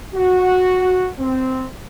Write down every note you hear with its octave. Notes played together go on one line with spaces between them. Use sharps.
F#4
C4